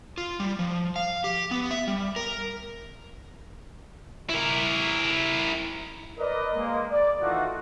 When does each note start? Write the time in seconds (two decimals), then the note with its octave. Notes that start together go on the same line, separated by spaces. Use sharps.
0.18 F4
0.40 G3
0.59 F3
0.96 F5
1.24 G4
1.51 B3
1.71 E5
1.87 G3
2.16 A#4
4.30 E4 A#4
6.18 A#4 B4 D5 D#5
6.55 G#3 A#3
6.91 D5
7.21 D#3 E3 A3 D#4 F4 F#4